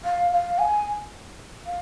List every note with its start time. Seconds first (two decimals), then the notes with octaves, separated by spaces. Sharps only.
0.05 F5
0.31 F5
0.59 G#5
1.66 F5